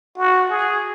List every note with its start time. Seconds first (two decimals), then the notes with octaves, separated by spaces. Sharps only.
0.17 F#4
0.50 G#4